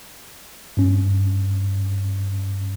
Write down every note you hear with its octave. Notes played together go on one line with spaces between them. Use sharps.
G2 C#4